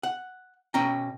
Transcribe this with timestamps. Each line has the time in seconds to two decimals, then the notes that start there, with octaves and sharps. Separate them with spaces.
0.03 F#5
0.74 B2 C#4 G5 A#5